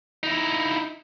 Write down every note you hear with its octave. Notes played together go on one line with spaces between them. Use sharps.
D#4 E4